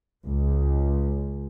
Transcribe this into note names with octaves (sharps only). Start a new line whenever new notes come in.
C#2